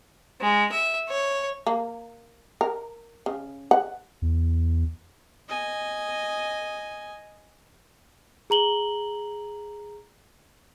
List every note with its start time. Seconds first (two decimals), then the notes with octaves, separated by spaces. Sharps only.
0.40 G#3
0.72 E5
1.09 C#5
1.67 A#3
2.61 A#4
3.26 C#3
3.71 F#5
4.22 E2
5.48 D#5 G#5
8.50 G#4 A#5 F#7 G7